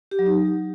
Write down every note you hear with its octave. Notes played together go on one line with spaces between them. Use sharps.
G4
F#3
D#4